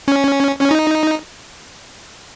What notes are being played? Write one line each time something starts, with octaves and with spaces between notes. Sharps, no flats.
C#4
C#4
D#4